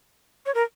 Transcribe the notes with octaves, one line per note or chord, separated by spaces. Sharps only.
C#5
A#4